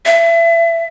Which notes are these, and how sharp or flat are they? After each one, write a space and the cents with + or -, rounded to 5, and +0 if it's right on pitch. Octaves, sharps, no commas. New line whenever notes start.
E5 +30